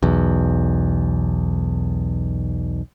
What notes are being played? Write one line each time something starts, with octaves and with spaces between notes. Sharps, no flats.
B1 E2